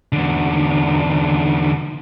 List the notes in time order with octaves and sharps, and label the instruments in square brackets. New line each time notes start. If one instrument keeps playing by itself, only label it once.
[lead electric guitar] E2 D3